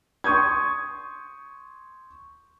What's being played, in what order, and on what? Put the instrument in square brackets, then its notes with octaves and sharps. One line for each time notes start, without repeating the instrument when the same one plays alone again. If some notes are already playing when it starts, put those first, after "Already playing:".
[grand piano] C6 C#6 D#6 G6 G#6